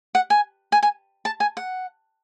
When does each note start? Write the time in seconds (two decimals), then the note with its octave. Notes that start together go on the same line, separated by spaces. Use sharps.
0.15 F#5
0.30 G#5
0.72 G#5
0.83 G#5
1.25 A5
1.40 G#5
1.57 F#5